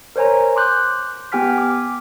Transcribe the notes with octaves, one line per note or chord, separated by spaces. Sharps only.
A#4 C5 C#5 G#5 A#5
C6 D6 F#6 G6
B3 G4 G5 G#5 F6 B6
D6